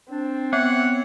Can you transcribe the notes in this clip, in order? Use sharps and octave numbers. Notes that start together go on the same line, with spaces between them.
C4 D4
B3 C#5 F#5